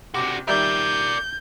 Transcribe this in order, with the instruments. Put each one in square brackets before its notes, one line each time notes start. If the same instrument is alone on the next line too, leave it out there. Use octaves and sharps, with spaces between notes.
[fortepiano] C3 D6 [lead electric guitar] D4 F#4
[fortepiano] D#3 G3 E5 [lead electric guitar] A#4 D5 [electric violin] G6